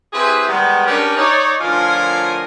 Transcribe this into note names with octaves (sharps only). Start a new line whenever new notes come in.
C4 E4 G4 G#4 B4
D#3 G3 G#3 B3
C#4 D4 G4 A#4 B4 D5
D#4 C#5 D5
A2 D3 F3 F4 A#4 G#5